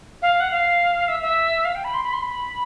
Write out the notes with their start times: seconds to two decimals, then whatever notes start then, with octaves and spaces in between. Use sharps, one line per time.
0.22 F5
0.40 F#5
0.51 F5
1.08 E5
1.21 E5
1.65 F5
1.75 G5
1.84 B5
1.94 C6
2.03 B5
2.13 C6
2.22 B5